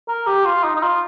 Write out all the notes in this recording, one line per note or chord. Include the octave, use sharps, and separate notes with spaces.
A#4
G4
F4
D#4
D#4
F4